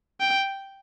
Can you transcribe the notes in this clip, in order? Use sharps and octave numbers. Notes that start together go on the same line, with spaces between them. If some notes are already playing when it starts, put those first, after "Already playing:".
G5